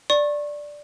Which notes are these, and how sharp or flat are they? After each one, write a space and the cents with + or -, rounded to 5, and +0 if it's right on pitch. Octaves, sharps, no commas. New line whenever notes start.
D5 +0 C#6 -30